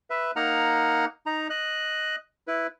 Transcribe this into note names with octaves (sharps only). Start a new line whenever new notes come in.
B4 E5
A#3 D#4 F#5 A#5 F6
D#4 A#5
D#5 F#6
E4 B4